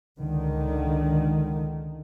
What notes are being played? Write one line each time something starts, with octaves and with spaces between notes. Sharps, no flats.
C#2 D3 D#3